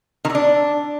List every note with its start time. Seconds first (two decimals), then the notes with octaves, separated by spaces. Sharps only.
0.25 D#3
0.30 D3
0.35 D4